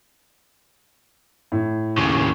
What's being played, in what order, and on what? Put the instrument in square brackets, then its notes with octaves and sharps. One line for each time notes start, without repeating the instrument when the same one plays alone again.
[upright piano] A2
[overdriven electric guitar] D#2 C#3